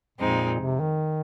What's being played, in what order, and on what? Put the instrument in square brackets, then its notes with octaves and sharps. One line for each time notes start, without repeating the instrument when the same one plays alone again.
[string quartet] F2 F3 G#3 C4 D#4 [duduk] A#2
[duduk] C3
D#3